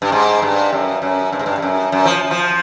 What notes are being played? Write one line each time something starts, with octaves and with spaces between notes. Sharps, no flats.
G2
G#2
G2
F#2
F#2
G2
G#2
G2
G2
F#2
F#2
F3
F3